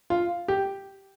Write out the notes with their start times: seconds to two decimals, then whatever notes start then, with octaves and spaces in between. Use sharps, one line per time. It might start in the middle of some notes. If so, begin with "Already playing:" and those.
0.10 F4
0.48 G4